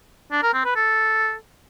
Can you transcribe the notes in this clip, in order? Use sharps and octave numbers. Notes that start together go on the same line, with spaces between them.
D4
A#4
C4
B4
A4